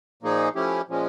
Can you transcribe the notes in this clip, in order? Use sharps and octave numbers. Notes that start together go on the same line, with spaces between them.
A#2 F3 A#3 D#4 G#4
F3 A3 C#4 E4 G4
A#2 F3 G#3 C#4